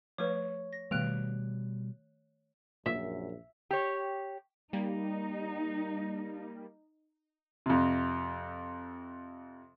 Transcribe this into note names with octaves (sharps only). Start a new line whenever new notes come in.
F3 A3 B4 C#5 C#6
A#6
B2 D#3 G3 A3 B3 F#6 D7 F7
A#1 F#2 A#2 E5
G4 C#5
G3 A#3 D#4
F2 C3